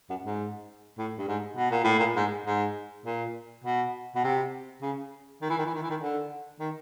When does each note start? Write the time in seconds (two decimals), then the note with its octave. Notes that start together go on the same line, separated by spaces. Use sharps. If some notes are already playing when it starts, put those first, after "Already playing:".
0.10 F#2
0.25 G#2
0.98 A2
1.18 G2
1.28 G#2
1.57 B2
1.71 A#2
1.84 A2
1.99 A#2
2.16 G#2
2.46 G#2
3.06 A#2
3.64 B2
4.15 B2
4.24 C3
4.82 C#3
5.41 D#3
5.50 E3
5.58 D#3
5.66 E3
5.74 D#3
5.83 E3
5.90 D#3
6.00 D3
6.60 D#3